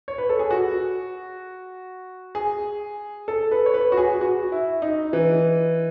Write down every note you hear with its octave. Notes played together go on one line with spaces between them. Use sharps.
C#5
B4
A4
G#4
F#4
G#4
A4
B4
C#5
B4
F#4
G#4
F#4
E4
D#4
E3